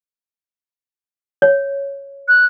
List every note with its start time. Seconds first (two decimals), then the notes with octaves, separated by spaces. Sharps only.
1.42 C#5
2.28 F#6